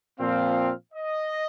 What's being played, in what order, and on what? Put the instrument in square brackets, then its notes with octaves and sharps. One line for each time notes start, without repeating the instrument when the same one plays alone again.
[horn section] A#2 F3 C4 [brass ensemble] F5
[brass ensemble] D#5